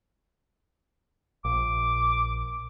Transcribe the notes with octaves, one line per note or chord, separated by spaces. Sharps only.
A#1 D6